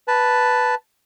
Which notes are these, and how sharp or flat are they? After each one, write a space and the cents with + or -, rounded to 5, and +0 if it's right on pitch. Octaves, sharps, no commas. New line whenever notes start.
B4 +0 A5 +0